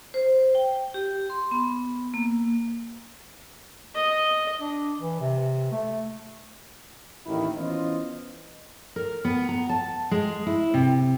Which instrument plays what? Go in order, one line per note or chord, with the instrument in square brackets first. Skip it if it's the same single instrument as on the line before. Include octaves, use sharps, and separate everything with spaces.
[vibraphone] C5
G5
G4
C6
B3
A#3
[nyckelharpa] D#5
[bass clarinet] D4
E3
C3
A3
[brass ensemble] A1 D#2 E4
E3 B3 C#4 F4 C5 D#5
[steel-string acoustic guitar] A#4
B3
A#5
A5
G#3
E4
C3